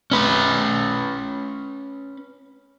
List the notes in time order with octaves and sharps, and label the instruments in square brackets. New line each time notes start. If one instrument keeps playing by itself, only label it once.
[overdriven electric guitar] C#4 B4